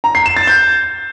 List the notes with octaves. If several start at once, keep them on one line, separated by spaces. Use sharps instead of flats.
A#5
C7
E7
A6
G6